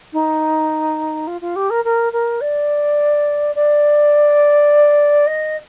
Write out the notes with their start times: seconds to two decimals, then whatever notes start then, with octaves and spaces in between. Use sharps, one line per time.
0.13 D#4
1.27 F4
1.41 F4
1.55 G4
1.70 A#4
1.84 A#4
2.12 A#4
2.41 D5
3.55 D5
5.26 D#5